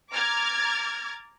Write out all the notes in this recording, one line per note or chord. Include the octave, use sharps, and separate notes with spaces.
A#5 D6 F6 G#6 A6